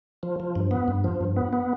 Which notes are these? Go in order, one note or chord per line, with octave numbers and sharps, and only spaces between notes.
F3
F3
G2
B3
G2
F3
G2
B3
B3